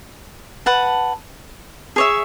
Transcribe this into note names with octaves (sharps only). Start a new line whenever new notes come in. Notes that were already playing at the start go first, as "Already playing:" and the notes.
B4 F#5 A5
G#4 C#5 E5